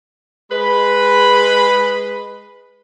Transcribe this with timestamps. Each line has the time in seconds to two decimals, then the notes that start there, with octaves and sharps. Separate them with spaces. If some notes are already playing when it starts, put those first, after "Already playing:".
0.51 G#3 B4 B5